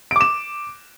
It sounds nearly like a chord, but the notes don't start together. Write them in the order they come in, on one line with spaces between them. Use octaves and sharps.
D7 D6 E7